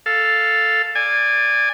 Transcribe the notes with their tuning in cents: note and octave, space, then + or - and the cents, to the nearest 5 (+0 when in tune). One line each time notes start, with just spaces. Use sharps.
A4 +0 F5 +0
D5 +5 G#5 -15